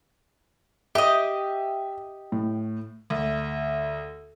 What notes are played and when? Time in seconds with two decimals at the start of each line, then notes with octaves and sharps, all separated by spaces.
0.95 G4 D#5 E5
2.32 A2
3.10 D2